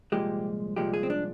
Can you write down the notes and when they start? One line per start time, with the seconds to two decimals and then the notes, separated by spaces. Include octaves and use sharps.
0.12 C2 A#2 F3 G#3 G4
0.76 C2 A#2 F3 G#3 G4
0.94 G#4
1.03 C4
1.10 D4